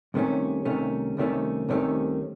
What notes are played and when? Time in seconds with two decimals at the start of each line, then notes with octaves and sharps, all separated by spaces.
0.14 C2 C3 D#3 A3 C#4
0.65 C2 C3 D#3 A3 C#4
1.17 C2 C3 D#3 A3 C#4
1.69 C2 C3 D#3 A3 C#4